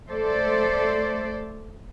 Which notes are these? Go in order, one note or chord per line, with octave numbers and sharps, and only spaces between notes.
A3 A4 C5 D5